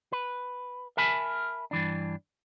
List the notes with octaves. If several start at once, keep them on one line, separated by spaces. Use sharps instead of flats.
B4
A#4 E5 G#5 A5 B5
G2 E3 D4